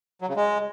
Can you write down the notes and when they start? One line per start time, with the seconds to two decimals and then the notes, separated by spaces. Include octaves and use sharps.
0.21 F#3
0.29 C#3
0.36 G#3